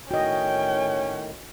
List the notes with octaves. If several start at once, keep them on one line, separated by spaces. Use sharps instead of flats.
A2 D#3 C#4 F#4 D#5 G5